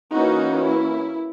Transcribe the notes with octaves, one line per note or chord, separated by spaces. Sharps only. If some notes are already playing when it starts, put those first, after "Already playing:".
E3 A#3 C#4 D#4 F#4
E4